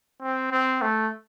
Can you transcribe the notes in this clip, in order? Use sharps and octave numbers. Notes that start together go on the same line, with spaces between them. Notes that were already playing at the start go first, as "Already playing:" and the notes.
C4
C4
A3